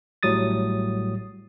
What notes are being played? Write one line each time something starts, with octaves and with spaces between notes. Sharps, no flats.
A1 A2 F#3 G3 D#6 A6